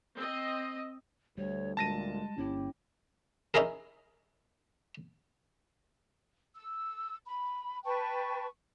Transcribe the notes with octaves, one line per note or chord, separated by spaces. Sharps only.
C4 D#5
D2 G3 C#5
D2 A#2 G#3 A5 A#6 D#7
G1 A#3 C#4 D4 E4 G4
C#4 D#4 E4 G#4 A#4
E6
B5
B4 G5 A5 C#6